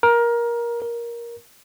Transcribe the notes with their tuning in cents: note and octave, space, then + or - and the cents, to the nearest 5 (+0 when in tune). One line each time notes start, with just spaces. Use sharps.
A#4 +20
A#4 +15